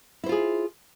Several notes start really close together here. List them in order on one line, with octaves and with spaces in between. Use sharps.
E4 C5 F4 G#4